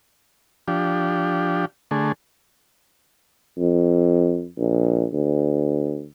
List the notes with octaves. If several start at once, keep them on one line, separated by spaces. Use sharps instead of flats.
F3 D4 G4
D3 A3 G#4
F2
A#1
D2